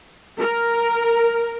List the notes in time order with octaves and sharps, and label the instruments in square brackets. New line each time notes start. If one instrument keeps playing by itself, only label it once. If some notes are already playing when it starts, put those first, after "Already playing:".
[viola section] A#4